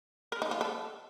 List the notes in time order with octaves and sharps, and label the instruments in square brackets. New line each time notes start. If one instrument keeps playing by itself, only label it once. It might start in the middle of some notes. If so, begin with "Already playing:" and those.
[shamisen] A#4
D#4
F4
A4